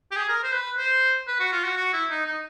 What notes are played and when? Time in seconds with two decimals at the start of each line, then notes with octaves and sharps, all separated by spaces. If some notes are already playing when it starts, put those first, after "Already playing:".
0.11 G4
0.16 G#4
0.29 A#4
0.43 C5
0.54 B4
0.78 C5
1.27 B4
1.40 F#4
1.52 F4
1.64 F#4
1.77 F#4
1.93 E4
2.10 D#4
2.26 D#4